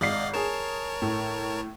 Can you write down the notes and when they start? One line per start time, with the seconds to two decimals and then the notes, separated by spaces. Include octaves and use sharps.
0.01 G#1 D5 D#5 F5 C7
0.34 G#4 A#4 C#5 A5 E7
1.02 A2